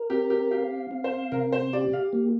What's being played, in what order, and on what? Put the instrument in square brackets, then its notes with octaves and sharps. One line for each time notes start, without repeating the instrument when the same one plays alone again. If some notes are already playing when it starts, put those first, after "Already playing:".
Already playing: [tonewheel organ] A#4
[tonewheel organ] C4 [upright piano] G4
[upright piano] G4
[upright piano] G4 [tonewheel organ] F5
[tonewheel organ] C4
[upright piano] C5
[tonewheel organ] C3 [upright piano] A#4
[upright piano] C5
[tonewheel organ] G4 [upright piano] D5
[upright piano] F5
[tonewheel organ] A#3